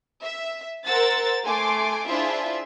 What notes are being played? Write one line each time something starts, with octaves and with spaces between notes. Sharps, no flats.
E5
A#4 C5 F#5 E6 A6
A3 G#5 C6 D6
D4 E4 F4 G#4 C5 E5